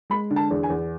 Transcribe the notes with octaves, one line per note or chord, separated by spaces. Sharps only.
G#3 B5
D3
A5
E2
G#5
E2